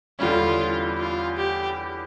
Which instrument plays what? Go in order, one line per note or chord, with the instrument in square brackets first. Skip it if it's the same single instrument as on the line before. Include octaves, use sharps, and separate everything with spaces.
[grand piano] E2 D3 G3 C#4 [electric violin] F4
[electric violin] F4
G4